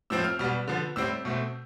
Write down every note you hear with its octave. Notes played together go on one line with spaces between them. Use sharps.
A2 F3 C4 E6
F6
B2 G3 B3 F6
D3 F3 B3
A2 G3 C4 E6
B2 A3 C4